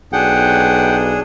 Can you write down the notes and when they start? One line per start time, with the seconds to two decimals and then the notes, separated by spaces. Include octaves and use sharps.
0.13 B1 D4 G#4 F#5 G5